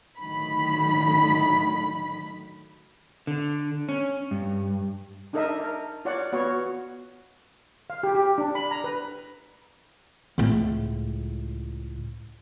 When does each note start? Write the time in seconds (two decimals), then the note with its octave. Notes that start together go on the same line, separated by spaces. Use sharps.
0.19 A2 D3 D#3 F#3 B5 B6
3.27 D3
3.89 C#4
4.31 G2
5.33 D4 D#4 A4 A#4 D#5 E5
5.60 A#4
6.05 F4 C#5 D5 F#5
6.33 B3 F4 F#4 C#5
7.90 F5
8.03 G4
8.15 G4
8.38 D4
8.55 B5
8.71 A#5
8.84 B4
10.38 C#2 A2